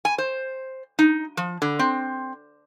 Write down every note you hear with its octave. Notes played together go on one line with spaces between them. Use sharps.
G#5
C5
D#4
F3
D3
C4